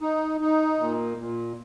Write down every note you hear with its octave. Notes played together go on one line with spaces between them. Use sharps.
D#4
D#4
A#2
A#2